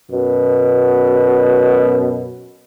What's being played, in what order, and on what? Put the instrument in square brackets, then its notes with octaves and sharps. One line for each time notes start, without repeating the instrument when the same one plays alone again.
[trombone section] F#2 B2